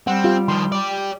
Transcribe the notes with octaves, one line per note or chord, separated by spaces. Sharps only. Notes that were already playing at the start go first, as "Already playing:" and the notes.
G3 C4 F#5
F4 G4 F5
D#3 F3 C6
G4 D5